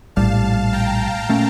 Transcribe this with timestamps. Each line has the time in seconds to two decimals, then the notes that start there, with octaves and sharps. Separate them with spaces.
0.16 A#1 A2 G3 F5 A5
0.73 G5 A#5
1.29 A#2 A3 C#4